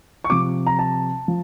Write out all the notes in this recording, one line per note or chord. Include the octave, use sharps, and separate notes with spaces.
C#6
C3 F3 D6
A#5
A5
F3